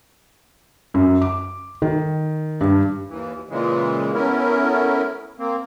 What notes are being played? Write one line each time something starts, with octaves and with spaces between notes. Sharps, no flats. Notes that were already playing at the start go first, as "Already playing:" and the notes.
F#2
D6
D#3
G2
D#2 E3
A#2 C#3 E3 G#3
A3 B3 C#4 E4 A#4
A#3 C4